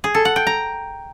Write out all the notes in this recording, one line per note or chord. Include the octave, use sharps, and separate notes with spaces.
G#4
A4
F#5
G5
A#5